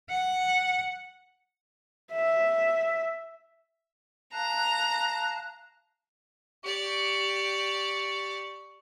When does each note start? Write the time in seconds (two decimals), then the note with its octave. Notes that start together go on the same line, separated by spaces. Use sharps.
0.10 F#5
2.13 E5
4.33 F5 A5 A#5 F#6
6.64 G4 D5 C#6